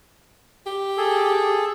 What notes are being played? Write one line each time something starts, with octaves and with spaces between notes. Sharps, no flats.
G4
G#4 A4